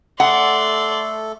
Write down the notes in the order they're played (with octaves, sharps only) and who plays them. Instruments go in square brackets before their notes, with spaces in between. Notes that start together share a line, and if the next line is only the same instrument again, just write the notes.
[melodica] A3 A4 [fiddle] D5 C6 [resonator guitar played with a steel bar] F#5